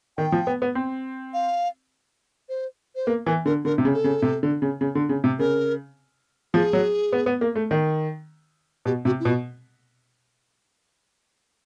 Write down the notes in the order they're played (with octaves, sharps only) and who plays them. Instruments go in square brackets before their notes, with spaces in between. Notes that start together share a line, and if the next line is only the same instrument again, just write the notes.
[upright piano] D#3 [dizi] G5
[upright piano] F3
B3
B3
C4
[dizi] F5
C5
C5
[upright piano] A#3 [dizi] B4
[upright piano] E3 [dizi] A#4
[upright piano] D3 [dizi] A#4
[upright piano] D3 [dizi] A#4
[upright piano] C3
C#3
[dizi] A4
[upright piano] C#3
C3
D3
C#3
C#3
D3
C#3
C3
[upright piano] C#3 [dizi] A#4
[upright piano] F3 [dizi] G#4
[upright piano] F#3
B3
B3
A#3
A3
D#3
[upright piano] B2 [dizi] G4
[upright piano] C3 [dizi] F#4
[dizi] E4
[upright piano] B2 [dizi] F4